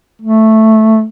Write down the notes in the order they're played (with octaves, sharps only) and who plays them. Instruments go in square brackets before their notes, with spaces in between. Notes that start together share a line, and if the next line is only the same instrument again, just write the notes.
[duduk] A3